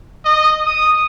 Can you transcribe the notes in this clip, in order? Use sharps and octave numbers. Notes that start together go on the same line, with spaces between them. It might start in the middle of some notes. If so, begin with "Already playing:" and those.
D#5
D#6